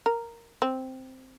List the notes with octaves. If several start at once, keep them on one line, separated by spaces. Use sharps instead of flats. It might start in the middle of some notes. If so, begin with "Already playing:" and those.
A#4
C4